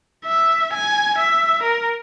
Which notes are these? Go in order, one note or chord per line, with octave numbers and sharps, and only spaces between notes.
E5
G#5
E5
A#4